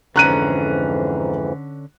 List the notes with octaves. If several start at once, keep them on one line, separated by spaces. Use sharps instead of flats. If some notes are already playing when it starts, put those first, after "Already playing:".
F2 G#2 D3 E3 C#4 A#5 F#6 D#7